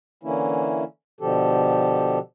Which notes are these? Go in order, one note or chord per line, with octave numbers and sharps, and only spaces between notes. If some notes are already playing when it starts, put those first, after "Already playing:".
D3 E3 A#3 C#4 E4
B2 D3 F3 G4 A4